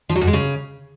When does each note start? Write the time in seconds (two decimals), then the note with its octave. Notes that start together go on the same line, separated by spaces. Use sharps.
0.09 F3
0.15 F#3
0.21 F#2
0.27 G#3
0.33 C#3